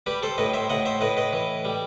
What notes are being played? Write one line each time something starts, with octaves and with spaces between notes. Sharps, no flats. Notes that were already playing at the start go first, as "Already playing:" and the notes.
G3 G4 B4
A4 C5
A2 B4 D#5
C5 E5
A2 D#5 F#5
C5 E5
A2 B4 D#5
B4 D#5
E3
G3